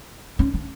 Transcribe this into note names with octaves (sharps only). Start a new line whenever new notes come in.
C#4
D4